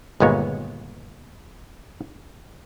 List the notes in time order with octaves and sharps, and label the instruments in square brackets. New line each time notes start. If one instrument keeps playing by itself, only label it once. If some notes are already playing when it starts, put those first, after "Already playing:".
[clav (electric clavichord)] G1 D#2 A#2 G#3 B3 C#5